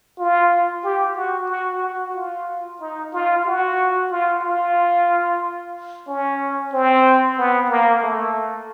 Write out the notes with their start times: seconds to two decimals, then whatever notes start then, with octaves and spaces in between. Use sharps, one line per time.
0.19 F4
0.84 G4
1.17 F#4
1.50 F#4
1.82 F#4
2.15 F4
2.81 D#4
3.14 F4
3.46 F#4
4.11 F4
4.43 F4
6.08 C#4
6.73 C4
7.38 B3
7.70 A#3
8.03 A3